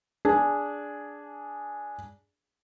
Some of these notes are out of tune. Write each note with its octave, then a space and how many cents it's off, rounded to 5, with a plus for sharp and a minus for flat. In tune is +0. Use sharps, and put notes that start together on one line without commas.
D4 -10 G#4 +0